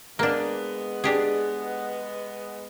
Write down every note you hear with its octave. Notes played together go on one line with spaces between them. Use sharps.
G#3 A#3 B3 D4
D4 G4 G#4